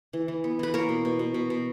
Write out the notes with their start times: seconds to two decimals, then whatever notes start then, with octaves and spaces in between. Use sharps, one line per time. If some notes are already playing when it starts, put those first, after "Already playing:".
0.13 E3
0.28 E3
0.44 B3
0.59 E3 B4
0.74 A#3 A#4 C#5
0.89 B2
1.05 B2
1.19 B2
1.34 B2
1.50 B2